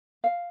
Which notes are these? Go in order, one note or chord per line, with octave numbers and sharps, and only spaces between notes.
F5